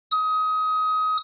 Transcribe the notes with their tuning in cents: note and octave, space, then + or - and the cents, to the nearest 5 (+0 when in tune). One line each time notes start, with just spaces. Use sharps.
D#6 +25